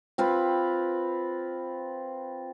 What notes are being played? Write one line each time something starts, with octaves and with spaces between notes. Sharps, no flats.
C4 F4 B4